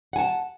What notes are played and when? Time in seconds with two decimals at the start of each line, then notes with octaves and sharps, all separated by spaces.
0.13 F#5
0.16 G#5
0.18 A5